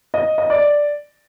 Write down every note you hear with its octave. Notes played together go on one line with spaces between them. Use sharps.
D#5
D#5
D5